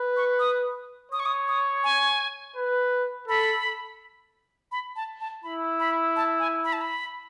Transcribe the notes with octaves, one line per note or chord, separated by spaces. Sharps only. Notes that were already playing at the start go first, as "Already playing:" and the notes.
Already playing: B4
C#6
D#6
C#5 D#6
C#6
D#6
D#6
G#5
B4
A4 B5
B5
A5
A5
E4 B5
B5
A5
G#5
B5
A5
B5